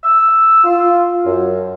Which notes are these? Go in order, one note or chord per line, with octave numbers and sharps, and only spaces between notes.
E6
F4
F#2